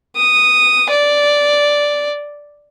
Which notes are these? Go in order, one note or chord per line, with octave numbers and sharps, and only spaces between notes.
D#6
D5